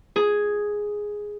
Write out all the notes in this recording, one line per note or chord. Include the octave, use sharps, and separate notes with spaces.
G#4